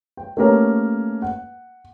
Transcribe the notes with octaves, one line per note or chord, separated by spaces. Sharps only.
G5
A3 A#3 C#4 G4 A#4 B4
F#5